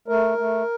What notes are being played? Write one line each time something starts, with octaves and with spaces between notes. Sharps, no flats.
A3 A#4
A3